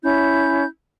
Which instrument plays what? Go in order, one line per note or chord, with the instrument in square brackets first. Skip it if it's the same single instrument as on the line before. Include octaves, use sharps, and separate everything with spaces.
[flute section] C#4 E4 G6